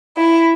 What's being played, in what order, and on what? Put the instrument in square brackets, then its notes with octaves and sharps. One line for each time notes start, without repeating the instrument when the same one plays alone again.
[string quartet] E4